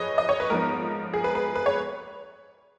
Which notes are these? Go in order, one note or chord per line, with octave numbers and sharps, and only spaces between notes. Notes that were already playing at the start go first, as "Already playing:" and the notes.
Already playing: F#2 F3 G#4 B4 C#5 D#5
D#5
C#5
B4
G#2 F3 B3 D#4 A#4
G#4
B4
B4
B4
C#5